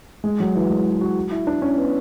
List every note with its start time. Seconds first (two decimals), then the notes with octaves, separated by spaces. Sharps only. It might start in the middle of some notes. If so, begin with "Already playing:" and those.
0.24 G#3
0.40 F#3
0.55 E3
0.70 G#3
1.01 F#4
1.31 E4
1.47 D4
1.62 C#4
1.77 B3